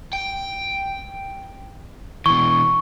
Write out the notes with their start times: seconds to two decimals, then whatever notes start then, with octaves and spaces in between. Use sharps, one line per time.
0.13 G5
2.26 B2 E3 C#6